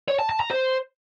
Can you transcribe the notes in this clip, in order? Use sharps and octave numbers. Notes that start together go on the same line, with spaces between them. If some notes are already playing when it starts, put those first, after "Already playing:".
C#5
A5
A5
A#5
C5